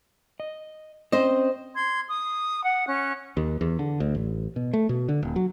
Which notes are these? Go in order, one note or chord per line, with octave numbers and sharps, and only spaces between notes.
D#5
C4 C#4 C5 D#5
C6 G#6
D#6
F#5
C#4 F#6
D#2
E2
D3
D2
A1
B2
A3
B2
D3
D#1
F#3